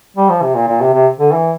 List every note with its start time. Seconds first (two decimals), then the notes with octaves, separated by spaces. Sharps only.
0.17 G3
0.30 F3
0.42 C3
0.55 A#2
0.68 A#2
0.81 C3
0.93 C3
1.19 D3
1.32 E3